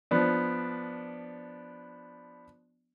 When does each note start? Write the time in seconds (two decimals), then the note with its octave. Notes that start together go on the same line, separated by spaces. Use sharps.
0.11 F3 B3 D4